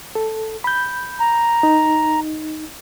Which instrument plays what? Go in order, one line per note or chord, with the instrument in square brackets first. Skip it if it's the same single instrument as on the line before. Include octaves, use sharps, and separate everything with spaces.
[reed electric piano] A4
B5 G6
[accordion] A#5
[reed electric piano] D#4